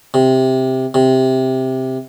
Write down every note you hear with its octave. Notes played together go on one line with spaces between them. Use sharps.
C3
C3